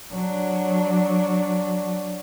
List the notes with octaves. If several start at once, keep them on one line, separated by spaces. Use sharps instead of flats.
F#3 D4